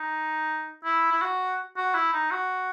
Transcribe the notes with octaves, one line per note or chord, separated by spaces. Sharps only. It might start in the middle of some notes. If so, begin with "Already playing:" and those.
Already playing: D#4
E4
E4
F#4
F#4
E4
D#4
F#4